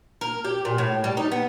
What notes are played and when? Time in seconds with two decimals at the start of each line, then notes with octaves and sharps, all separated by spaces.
0.21 A#4
0.45 G4
0.65 A#2
0.78 A2
1.04 G3
1.17 D#4
1.32 B3